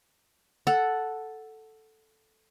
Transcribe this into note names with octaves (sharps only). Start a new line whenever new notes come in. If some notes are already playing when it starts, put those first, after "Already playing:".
A4 F#5